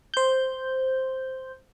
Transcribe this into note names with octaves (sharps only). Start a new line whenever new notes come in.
C5 G6